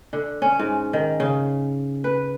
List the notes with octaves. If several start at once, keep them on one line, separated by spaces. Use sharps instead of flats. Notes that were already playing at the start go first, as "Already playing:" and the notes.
D3
C#4
G#2
D#3
C#3
B4